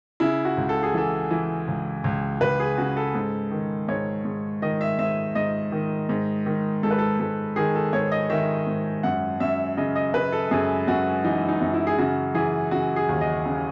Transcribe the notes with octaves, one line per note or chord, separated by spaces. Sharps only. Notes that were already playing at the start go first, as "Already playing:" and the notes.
C#3 E4
F#4
C#2
A4
G#4
E3 A4
E3
C#2
C#2
C#2 B4
G#4
C#3 F#4
A4
G#2
D#3
G#2 C#5
G#2
D#3 D#5
E5
G#2 E5
G#2 D#5
D#3
G#2
D#3
G#2 A4
B4
A4
G#2 A4
D#3 G#4
A4
G#2 C#5
D#5
D#3 E5
G#2
F#2 F#5
F#2 E5
C#3 D#5
D#5
C#3 B4
A4
F#2 G#4
F#2 F#4
E3 D#4
D#4
F#2
E4
G#4
C#3 F#4
E3 G#4
C#3 F#4
G#4
D#2
D#5
C#3